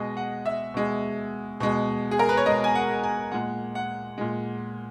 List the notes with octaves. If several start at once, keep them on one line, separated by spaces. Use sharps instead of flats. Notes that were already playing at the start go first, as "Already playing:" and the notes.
Already playing: B2 G#3 D#5
F#5
E5
B2 G#3
B2 G#3
G#4
A#4
B4
C#5
B2 G#3 D#5
G#5
F#5
G#5
A#2 G#3 F#5
F#5
A#2 G#3